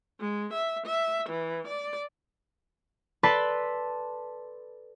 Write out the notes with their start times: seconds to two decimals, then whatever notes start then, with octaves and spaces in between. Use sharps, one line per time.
0.20 G#3
0.53 E5
0.86 E5
1.29 E3
1.68 D5
3.23 A4 B4 D5 A5 B5 C6